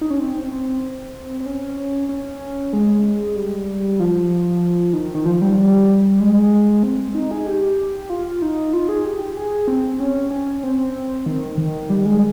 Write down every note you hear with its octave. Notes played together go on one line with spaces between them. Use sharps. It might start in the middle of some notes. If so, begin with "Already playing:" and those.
D#4
C#4
C4
C4
C4
C#4
C#4
G#3
G3
F3
D#3
D#3
F3
G3
G#3
C4
D#4
G#4
G4
F4
D#4
F4
G#4
G4
G#4
C4
C#4
C#4
C4
D#3
D#3
G3
G#3